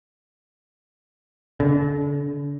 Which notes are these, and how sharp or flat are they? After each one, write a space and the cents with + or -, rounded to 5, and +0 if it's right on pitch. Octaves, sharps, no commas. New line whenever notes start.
D3 -40